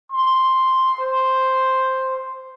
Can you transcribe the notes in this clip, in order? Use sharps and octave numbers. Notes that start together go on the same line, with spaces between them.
C6
C5